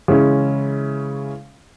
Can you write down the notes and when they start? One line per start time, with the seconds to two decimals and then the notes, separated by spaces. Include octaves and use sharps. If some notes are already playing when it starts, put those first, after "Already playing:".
0.08 C#3 E3 G#3 C#4 E4